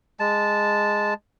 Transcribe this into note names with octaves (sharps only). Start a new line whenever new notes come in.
G#3 A5